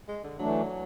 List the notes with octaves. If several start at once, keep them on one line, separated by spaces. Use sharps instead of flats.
G#3
D3
E3 F#3 A3 D4